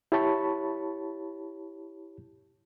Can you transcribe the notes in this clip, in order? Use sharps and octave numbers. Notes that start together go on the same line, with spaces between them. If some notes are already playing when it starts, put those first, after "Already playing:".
E4 G4 C#5 A5 B5 C#6